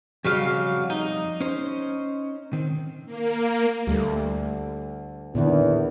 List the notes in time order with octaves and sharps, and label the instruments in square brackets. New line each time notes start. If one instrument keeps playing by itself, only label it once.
[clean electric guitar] F2 G3 [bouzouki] C#3 F#3 F5
[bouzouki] D#4
[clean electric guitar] C#4 C5
D#3 C4
[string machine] A#3
[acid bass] D2 [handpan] G3 A3
[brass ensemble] E2 [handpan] A#2 D3 D#3